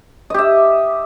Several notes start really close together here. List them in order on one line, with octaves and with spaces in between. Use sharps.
D#5 G4 E5